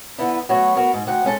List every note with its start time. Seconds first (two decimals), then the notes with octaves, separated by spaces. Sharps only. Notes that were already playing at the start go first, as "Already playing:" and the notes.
0.18 D3 B3 E4
0.49 F#3 A3 B3 F#4 C#5
0.76 B3 F#4 A#4
0.93 G#2
1.07 D2 F#5 G5
1.24 G#3 C#4 A4